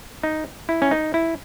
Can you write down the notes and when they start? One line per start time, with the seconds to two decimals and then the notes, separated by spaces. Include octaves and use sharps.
0.23 D#4
0.69 E4
0.82 C#4
0.91 D#4
1.14 E4